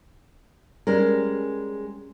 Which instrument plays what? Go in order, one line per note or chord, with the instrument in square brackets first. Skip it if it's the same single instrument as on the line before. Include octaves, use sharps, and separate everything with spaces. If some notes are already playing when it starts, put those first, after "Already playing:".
[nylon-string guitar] G3 G#3 C#4 A#4